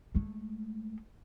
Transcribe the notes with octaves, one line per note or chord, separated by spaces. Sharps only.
G#3 A3